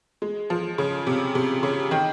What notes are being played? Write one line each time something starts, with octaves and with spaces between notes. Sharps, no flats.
G#3
F3
C#3
C3
C3
C#3
D#3